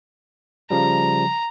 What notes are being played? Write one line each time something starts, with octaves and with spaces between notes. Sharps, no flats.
C#3 F3 G3 A#5